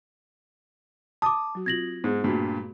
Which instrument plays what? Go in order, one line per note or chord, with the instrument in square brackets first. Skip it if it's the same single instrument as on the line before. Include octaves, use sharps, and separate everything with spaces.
[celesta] A5 D6 [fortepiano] D#6
[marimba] F#3 F#4
[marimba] C4 F4 [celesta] G#6 A#6 F#7
[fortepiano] G#2 [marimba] B3 G#4
[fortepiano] G2 A#2 [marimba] A3 F#4